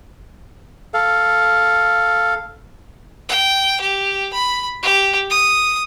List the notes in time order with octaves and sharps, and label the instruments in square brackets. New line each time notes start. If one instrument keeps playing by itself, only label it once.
[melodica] A4 F5
[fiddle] G5
G4
B5
G4
D#6